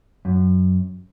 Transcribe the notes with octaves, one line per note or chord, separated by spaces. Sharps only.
F#2